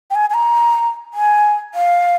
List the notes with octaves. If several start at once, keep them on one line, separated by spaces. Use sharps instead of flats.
G5
G#5
G#5
A#5
G#5
F5